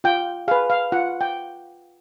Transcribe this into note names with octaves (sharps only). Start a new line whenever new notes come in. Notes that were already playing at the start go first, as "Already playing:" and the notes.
F4 G5
G#4 B4 F5
F5
F4 F#5
G5